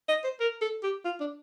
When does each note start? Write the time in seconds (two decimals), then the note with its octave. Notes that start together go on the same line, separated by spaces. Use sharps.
0.09 D#5
0.24 C5
0.40 A#4
0.61 A4
0.83 G4
1.05 F4
1.20 D4